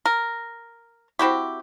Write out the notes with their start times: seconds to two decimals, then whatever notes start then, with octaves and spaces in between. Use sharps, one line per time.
0.06 A#4
1.19 C4 E4 F#4 G4